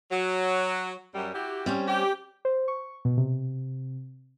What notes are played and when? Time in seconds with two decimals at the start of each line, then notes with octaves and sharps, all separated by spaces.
0.11 F#3
1.14 F#2 G3
1.33 E4 F#4 G4
1.66 G3 C4 C#4
1.87 G4
2.45 C5
2.68 C#6
3.05 B2
3.17 C3